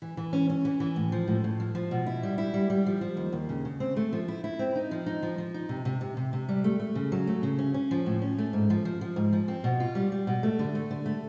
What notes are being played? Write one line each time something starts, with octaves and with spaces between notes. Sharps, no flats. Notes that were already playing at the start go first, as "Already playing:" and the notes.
E3
E3
C#4
C#4
E3
E3
A2
F3
A2
A2
F3
F3
B2
E4
G3
E4
G3
G3
F3
F3
D#2
D#2
C#3
C#3
C4
A3
F3
E4
E4
C4
D#4
F3
D#4
F3
F3
D#4
C3
C3
C3
C3
C3
G3
A3
A3
C#3
F#3
A3
C#3
C#4
C#4
F3
A2
C#4
A3
G#2
F3
F3
F3
G#2
F3
C4
B2
F4
G3
G3
B2
A3
D3
A3
D3
A3